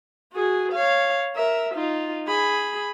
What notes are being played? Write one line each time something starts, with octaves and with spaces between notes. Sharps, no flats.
F#4 G#4
C#5 F5
A#4 E5
D#4 F4
G#4 B5